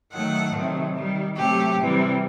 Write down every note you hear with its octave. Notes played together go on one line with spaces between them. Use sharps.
D#3 F#3 A3 F#5
C3 D#3 F#3 A3
D#3 G3
C3 F#3 A3 G4
C3 E3 G3